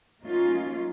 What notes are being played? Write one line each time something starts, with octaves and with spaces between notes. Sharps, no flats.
F#3 A3 A#3 C#4 D#4 F4